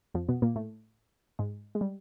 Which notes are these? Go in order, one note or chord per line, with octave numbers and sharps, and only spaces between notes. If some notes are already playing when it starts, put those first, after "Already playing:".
F2 F3
B2 B3
A#2 A#3
A2 A3
G#2 G#3
G#3
G3